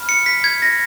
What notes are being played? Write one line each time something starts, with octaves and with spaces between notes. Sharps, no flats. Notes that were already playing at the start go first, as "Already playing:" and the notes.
Already playing: B5 F6
C#7
B6
G#6
A#6